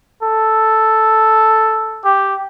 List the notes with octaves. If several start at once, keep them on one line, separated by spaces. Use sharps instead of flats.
A4
G4